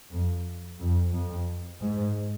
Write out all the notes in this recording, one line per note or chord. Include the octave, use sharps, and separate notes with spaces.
F2
F2
F2
G#2